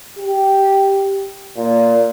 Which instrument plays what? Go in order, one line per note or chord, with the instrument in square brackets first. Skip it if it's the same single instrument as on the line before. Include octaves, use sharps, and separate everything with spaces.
[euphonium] G4
A#2